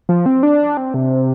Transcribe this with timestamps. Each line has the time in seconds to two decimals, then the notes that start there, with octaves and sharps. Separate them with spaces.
0.09 F3
0.26 C4
0.43 D4
0.77 C4
0.94 C3